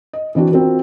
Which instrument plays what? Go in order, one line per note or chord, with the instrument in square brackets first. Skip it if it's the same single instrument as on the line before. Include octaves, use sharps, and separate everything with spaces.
[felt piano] D#5
E3 C4 D4 F#4
C4 F4 F#4 A#4